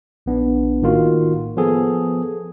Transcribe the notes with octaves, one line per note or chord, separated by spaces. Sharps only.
A#1 B3 D4
A2 D#3 A#3 F4 F#4
F3 B3 G#4 A4